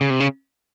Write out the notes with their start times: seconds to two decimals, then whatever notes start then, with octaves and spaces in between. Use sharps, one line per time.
0.01 C#3
0.10 C3
0.20 C#3